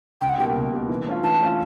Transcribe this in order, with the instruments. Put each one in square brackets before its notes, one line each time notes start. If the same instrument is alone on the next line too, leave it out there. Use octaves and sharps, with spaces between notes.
[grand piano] C#2 [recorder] G5
[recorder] F#5
[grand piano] B2 G3 A#3 [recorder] G5
[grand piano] C#2
B2 G3 A#3
E3
A3 C#4 F4
[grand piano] E3 [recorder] A5
[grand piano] A3 C#4 F4